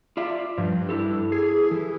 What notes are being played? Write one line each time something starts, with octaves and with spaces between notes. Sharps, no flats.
F4 D5 E5
G2 F3
E4 G4 A4
G#4
E3